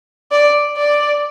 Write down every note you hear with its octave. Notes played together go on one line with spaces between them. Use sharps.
D5
D5